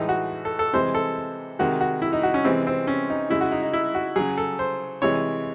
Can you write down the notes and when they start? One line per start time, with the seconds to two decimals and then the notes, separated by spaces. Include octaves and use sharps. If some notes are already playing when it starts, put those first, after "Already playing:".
Already playing: A2 E3 G#3 D#4
0.09 F#4
0.45 A4
0.59 A4
0.73 C3 E3 G#3 C5
0.95 A4
1.59 C3 D#3 G#3 F#4
1.81 F#4
2.02 E4
2.13 D#4
2.23 F#4
2.34 C#4
2.44 C3 E3 G#3 C4
2.67 C4
2.87 C#4
3.10 D#4
3.30 C#3 G#3 E4
3.41 F#4
3.52 D#4
3.62 D#4
3.73 E4
3.95 F#4
4.16 C#3 F#3 G#4
4.37 A4
4.59 C5
5.02 C3 E3 G#3 C#5